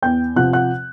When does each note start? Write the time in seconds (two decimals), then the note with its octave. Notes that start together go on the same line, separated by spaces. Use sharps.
0.02 E2 G5 G6
0.36 C3 F3 F#5 F#6
0.53 F#5 F#6